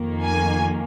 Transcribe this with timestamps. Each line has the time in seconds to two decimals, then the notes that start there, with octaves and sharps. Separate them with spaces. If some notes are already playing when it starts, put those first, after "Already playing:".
Already playing: F2 D#3 A#3
0.23 G#5